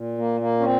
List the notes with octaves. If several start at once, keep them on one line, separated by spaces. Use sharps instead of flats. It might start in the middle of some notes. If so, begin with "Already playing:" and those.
Already playing: A#2
A#3
A#3
C#4
C4